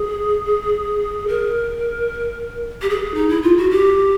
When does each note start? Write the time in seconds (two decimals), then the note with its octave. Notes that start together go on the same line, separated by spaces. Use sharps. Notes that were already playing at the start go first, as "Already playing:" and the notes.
Already playing: G#4
1.28 A#4
2.82 G4
2.90 G#4
3.15 D#4
3.29 E4
3.43 F4
3.57 F#4
3.71 G4